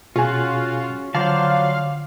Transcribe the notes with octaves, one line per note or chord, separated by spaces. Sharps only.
B2 C#4 F4 F#4 G#4 G#5
D3 F3 F#3 C5 D5 F5 A5